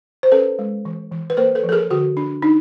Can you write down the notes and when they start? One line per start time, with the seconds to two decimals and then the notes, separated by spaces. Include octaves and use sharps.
0.23 C5
0.32 C#4 A4 B4
0.59 G#3
0.85 E3
1.12 E3
1.30 B4
1.37 A#3 A#4 C5
1.55 A4 B4
1.64 F3
1.69 A4
1.72 G#4 A#4
1.91 D3 F#4 G#4
2.17 D4
2.42 D4 D#4